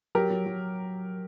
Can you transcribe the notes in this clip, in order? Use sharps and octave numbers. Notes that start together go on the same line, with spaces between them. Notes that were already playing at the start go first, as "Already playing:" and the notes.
F#3 G4 A#4
F#3
F#3